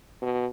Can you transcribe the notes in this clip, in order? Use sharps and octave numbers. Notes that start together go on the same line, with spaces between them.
B2